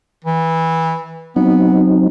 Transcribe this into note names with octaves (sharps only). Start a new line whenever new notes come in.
E3
F#3 B3 C4 D#4